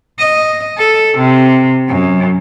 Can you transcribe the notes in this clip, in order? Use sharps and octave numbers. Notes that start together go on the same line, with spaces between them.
D#5
A4
C3
F#2